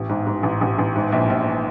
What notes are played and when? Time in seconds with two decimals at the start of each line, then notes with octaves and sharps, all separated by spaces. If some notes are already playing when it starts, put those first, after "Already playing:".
Already playing: A1
0.09 G#2
0.26 G#2
0.43 A1
0.61 A1
0.78 A1
0.95 G#2
1.12 A#1
1.30 A#1